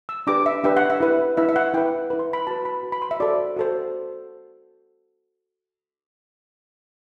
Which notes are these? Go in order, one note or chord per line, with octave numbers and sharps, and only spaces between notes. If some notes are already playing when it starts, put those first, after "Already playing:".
E6
D4 G4 B4 D6
E5
D4 G4 B4 E5
F#5
E5
E4 B4
E4 B4 E5
E5
F#5
E4 B4 G5
E4 B4
C6
B5
F#4 B4 A5
B5
F#4 B4
B5
C6
E5
F#4 A4 C5 D5
F#4 A4 C5